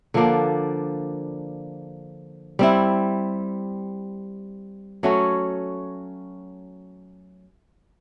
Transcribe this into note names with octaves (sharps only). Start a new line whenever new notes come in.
D3 F3 A#3 D4
G3 C4 E4
F#3 A3 C#4 F#4